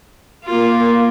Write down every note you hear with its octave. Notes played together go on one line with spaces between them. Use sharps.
A#3 F4